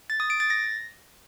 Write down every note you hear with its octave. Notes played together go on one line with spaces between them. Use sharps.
A6
D#6
D7
A6
A#6